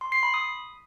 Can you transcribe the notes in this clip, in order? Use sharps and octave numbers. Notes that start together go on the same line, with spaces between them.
C6
C7
B5
D#6